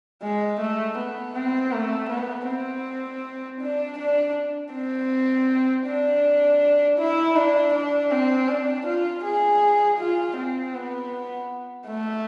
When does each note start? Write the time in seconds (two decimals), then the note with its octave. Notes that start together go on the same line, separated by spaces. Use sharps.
0.22 G#3
0.60 A3
0.98 B3
1.35 C4
1.73 A3
2.10 B3
2.48 C4
3.61 D4
3.99 D4
4.73 C4
5.86 D4
6.99 E4
7.36 D4
7.74 D4
8.12 C4
8.49 D4
8.87 F4
9.24 G#4
9.99 F4
10.38 C4
10.74 B3
11.88 A3